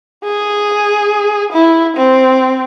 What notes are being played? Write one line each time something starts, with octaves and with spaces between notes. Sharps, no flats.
G#4
E4
C4